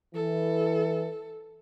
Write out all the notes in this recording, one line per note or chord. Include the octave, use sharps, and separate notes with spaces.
E3 A4